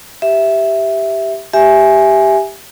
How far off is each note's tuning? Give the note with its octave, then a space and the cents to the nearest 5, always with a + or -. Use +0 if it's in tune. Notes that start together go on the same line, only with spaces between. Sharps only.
G4 +0 E5 +0
G4 +0 E5 +0 G#5 +0